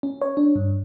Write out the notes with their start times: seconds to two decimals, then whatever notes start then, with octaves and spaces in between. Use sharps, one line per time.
0.03 C#4
0.21 C#5
0.37 D4
0.56 G2